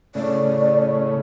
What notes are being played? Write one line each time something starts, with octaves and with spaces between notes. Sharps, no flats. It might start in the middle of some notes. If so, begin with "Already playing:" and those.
A2 C#3 D5